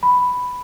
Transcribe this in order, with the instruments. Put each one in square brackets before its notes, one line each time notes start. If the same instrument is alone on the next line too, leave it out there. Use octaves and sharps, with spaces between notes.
[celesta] B5